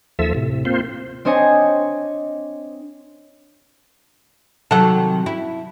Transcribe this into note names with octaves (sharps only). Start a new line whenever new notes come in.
D#2 F3 A4 E5
A2 C3
A#3 C4 F4 C5
C4 D4 C5 C#5 D#5 G#5
C3 D#3 F#3 A4 F#5
E4